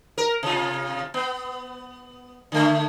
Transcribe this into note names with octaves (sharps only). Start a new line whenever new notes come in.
A#4
C3 F4
B3
D3 A3